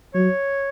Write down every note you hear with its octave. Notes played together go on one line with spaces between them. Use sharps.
F#3 C#5